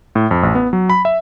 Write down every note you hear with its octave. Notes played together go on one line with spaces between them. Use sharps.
A2
F2
A1
B3
F#3
B5
E5